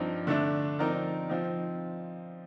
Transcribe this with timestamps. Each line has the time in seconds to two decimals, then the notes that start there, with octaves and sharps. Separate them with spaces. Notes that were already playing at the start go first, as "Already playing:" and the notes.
Already playing: G2 F3 C4 D#4
0.27 D3 A3 D4
0.79 F3 C4 D#4 A#4 D5
1.29 F3 C4 D#4